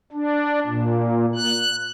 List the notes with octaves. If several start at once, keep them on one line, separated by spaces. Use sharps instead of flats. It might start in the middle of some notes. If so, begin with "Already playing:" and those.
D4
A#2
F#6